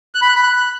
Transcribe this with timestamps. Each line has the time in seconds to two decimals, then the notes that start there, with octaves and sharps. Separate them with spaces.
0.15 F#6
0.22 B5
0.29 F#6
0.36 B5
0.43 F#6